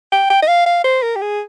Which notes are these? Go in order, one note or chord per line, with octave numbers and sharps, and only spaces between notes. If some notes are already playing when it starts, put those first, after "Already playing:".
G5
G5
D#5
F5
F5
C5
A#4
G4
G#4